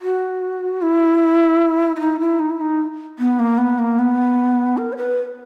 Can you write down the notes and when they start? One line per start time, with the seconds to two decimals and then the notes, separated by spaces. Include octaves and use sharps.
0.01 F#4
0.82 E4
1.96 E4
2.00 D#4
2.20 E4
2.39 D#4
2.50 E4
2.61 D#4
3.19 B3
3.39 A#3
3.58 B3
3.79 A#3
3.99 B3
4.77 A#4
4.92 C#5
4.97 B4